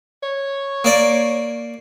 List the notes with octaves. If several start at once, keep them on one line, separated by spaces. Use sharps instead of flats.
C#5
A#3 D5